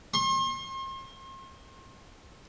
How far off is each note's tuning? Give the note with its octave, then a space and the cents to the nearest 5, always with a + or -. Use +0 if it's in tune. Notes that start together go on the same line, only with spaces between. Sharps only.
C6 +40